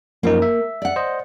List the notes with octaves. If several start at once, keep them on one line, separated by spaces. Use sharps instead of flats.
F#2 F3 A#3 D#4
E5
D5 F#5
C5 D#5